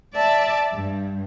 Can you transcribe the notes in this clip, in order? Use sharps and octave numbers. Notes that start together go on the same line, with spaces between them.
D5 E5 A5 D6
G2